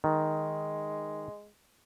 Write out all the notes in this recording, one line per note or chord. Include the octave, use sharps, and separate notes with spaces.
D#3 G#3